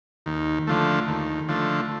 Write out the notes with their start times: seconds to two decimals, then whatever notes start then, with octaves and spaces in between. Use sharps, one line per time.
0.26 D#2
0.67 D3 F3 A3
1.08 D#2
1.48 D3 F3 A3